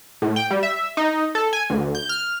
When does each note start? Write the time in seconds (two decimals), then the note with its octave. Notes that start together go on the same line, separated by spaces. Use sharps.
0.22 A2
0.36 G5
0.51 G3
0.63 E5
0.97 D#4
1.35 A4
1.53 G#5
1.70 D2
1.95 G6
2.09 F6